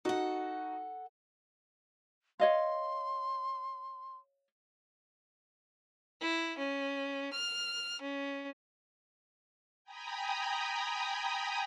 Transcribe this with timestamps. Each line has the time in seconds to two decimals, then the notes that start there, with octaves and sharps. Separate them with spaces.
0.05 D#4 F#4 A4 F#5
2.40 C#5 D#5 F5 C6
6.22 E4
6.58 C#4
7.33 F6
8.01 C#4
9.84 G5 G#5 A#5 B5 D#6